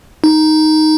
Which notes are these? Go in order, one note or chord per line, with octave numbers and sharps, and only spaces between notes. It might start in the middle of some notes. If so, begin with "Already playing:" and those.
D#4